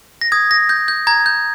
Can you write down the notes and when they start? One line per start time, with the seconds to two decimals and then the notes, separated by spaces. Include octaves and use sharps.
0.21 A#6
0.32 D#6 G#6
0.51 A#6
0.69 G6
0.88 G6
1.07 A#5 G#6
1.26 G6